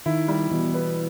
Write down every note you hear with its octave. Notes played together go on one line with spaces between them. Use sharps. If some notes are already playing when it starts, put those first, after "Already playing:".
D#3 E4
G3
B2 E3
B3